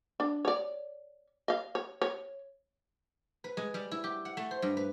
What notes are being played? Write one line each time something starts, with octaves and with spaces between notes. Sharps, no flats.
D4
C#5 D5
D#5 F5
C#5
C#5
B4
G#3
G3
E4
G4
F#5
A3
C5
G2
B4